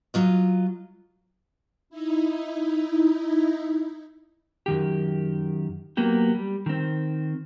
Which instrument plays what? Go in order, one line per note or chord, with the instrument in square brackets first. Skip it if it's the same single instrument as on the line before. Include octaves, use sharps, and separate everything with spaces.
[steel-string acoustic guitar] F#3 F4 D#5
[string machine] D#4 E4
[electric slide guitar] F#2 D#3 G4
F#3 A#3 B3 G4
G3
D#3 C4